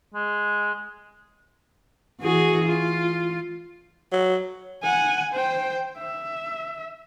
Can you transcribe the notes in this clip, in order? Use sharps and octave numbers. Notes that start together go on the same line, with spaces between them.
G#3
E3 F#4 G#4
F4
F#3
F#5 G#5
C5 G5
E5